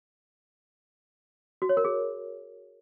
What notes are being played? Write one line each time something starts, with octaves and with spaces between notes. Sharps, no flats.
F#4
C#5
A#4
G#4